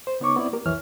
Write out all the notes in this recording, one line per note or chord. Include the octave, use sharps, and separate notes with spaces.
C5
C#3 B3 D#4 C#5 C#6 D6
B3 C4 E4 D5
A#3 G4 A#4
C2 F2 E3 C#5 F6